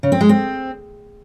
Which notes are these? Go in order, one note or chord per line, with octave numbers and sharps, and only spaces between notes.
C#3
C4
G#3
C4